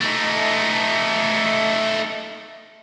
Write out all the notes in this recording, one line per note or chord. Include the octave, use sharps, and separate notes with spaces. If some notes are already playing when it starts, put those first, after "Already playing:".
A3 D#4